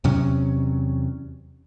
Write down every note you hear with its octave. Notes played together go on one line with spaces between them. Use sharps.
E2 C3 F#3 C#4